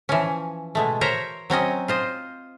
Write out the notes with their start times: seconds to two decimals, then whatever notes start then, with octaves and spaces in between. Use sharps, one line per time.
0.09 E3 F3 C#4
0.75 B2 G#3 A3
1.01 A#4 C5 C#5 E5 A#5
1.50 F#3 C4 C#4 D#5
1.88 F4 C5 D#5